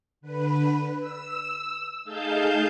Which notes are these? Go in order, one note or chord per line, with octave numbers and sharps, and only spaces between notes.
D3 B4
E6
A3 D#4 G#4 F5 A5 G6